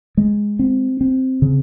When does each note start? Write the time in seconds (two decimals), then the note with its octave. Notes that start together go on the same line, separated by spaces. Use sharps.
0.17 G#3
0.59 C4
1.01 C4
1.42 C#3